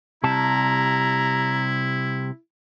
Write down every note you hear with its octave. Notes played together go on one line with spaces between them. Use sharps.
C3 G3 E4 A5 A#5